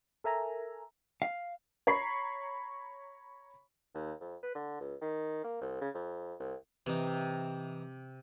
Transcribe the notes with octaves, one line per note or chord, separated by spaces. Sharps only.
A4 A#4 E5 G#5 A#5
F5
C#5 A#5 B5 C#6 B6 C7
D#2
F2
B4
D3
C#2
D#3
A#3
C2
C#3
F2
C2
C3 E3 D#4